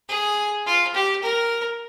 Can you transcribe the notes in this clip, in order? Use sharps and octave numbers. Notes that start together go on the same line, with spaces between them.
G#4
F4
G4
A#4